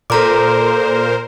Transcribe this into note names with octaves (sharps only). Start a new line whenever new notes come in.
A#2 A4 A#4 C5 A#5 D6